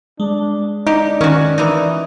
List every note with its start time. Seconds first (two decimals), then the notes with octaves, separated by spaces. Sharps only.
0.20 G#3 D4
0.87 D#4 G4 D5
1.21 D#3 C#4 F#4
1.58 E3 D#4